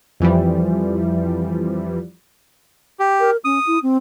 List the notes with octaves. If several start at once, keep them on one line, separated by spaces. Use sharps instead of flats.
F2 E3 F3 G3
G4
A#4
C#4 D#6
E4
C4